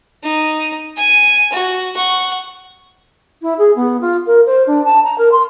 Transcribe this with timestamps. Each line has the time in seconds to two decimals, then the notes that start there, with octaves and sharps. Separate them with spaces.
0.23 D#4
0.96 G#5
1.52 F#4
1.95 F#5 C#6
3.42 E4
3.58 G#4
3.75 B3
4.01 F4
4.27 A#4
4.46 C5
4.67 D4
4.85 A5
5.04 A#5
5.18 A#4
5.31 C6